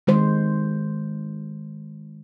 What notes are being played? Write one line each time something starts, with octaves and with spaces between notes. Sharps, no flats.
D#3 G#3 C5